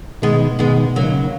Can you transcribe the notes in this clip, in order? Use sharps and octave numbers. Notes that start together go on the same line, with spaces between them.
B2 D#3 G#3 B3
B2 D#3 G#3 B3
C#3 F#3 A#3
D#3
C#3